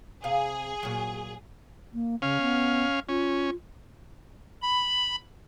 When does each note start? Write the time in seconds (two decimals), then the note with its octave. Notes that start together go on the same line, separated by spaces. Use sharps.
0.24 C3 G#4 F5
0.83 A#2 F#3
1.94 A#3
2.22 C#3 C#4 F5
2.41 B3
3.09 C#4 F4
4.62 B5